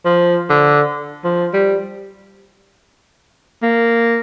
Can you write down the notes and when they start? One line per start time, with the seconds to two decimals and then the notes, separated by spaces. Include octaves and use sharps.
0.05 F3
0.50 D3
1.24 F3
1.53 G3
3.63 A#3